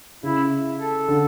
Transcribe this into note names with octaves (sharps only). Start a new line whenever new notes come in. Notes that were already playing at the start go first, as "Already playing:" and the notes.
C#3 E4
A4
D3